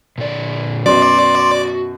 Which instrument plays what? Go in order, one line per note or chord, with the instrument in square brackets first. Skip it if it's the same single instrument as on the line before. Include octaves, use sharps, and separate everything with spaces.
[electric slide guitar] A#2 D3 D5
[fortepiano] F#2 B2 [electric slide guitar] F#4 [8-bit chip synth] D5 [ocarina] C6